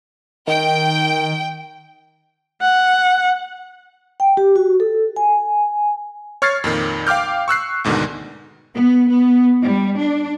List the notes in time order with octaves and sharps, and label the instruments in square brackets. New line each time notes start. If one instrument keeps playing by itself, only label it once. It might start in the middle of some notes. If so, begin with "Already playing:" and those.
[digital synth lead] D#3 [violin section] G5
[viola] F#5
[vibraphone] G5
G4
F#4
A4
G#5
[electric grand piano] C#5 C#6 F6 G#6 A6 C7
F2 A#2 D#3
F5 G5 D6 F6 G6
C#6 E6 F#6 C7
D2 G#2 B2 D3 D#3
[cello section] B3
B3
G3
D4